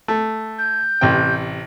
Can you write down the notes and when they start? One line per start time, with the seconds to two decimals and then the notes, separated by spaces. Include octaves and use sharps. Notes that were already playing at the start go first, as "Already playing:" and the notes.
0.08 A3
0.59 G6
1.01 A1 C3 G5